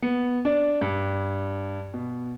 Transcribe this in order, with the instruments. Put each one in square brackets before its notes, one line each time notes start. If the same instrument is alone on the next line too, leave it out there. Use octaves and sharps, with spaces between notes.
[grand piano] B3
D4 D5
G2
B2